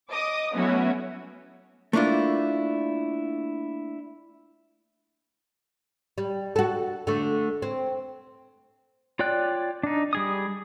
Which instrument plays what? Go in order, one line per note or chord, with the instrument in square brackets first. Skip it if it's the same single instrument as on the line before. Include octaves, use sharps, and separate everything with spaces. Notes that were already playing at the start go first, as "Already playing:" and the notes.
[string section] D#5 D6 D#6
F#3 A3 B3 C#4 E4 F#4
[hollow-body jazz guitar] A3 A#3 D4 E4 F4
[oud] G3
F#4 A4
D3 A3
C4
[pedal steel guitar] F4 C#5 D5 G5 F#6
D4 D#4
G3 G#4 D#6